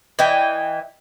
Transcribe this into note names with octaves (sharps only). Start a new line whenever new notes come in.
E3 D#5 G5